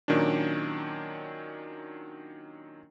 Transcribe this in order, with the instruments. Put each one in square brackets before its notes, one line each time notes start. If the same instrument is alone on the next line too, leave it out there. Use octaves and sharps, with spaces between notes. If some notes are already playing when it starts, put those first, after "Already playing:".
[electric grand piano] A#2 D#3 F#3 C#4 D4